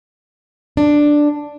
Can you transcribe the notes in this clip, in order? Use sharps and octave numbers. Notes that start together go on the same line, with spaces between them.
D4